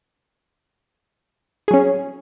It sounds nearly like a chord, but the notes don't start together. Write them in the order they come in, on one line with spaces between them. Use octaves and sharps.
G#4 F#3 C#4